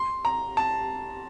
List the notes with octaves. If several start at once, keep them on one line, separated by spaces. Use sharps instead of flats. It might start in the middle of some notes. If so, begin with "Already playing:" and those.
Already playing: C6
A#5
A5